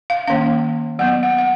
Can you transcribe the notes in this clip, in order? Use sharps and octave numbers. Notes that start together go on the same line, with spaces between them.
F5
D#3 A#3 C#4 F5
F#3 B3 F#5
F#5
F#5